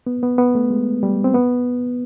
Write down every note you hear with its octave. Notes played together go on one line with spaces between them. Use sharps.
B3
B3
B3
A3
G#3
G3
C4
B3